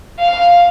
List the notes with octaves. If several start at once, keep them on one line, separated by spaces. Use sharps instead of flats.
F5